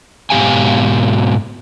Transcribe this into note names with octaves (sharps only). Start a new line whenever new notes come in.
G#2 B2 G3 G4 F5 G#5